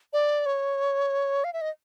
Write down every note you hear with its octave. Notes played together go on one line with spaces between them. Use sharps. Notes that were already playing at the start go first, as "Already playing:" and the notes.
D5
C#5
F5
E5
D#5